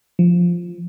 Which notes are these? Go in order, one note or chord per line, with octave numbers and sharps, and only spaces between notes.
F3